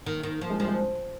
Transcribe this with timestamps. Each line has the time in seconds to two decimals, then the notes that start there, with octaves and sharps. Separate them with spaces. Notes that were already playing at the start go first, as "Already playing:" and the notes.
0.06 D#3 A#3
0.23 D#3
0.41 F3 A#3
0.50 G#3
0.59 F3 G3
0.68 G#3